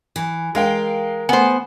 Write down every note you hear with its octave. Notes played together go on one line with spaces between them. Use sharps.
E3
G#3 A#4 F5 G5
A3 B3 C5 F#5 G#5